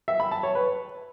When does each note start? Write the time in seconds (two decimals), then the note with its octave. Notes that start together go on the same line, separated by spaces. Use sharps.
0.08 E5
0.20 B5
0.31 A5
0.43 C#5
0.55 B4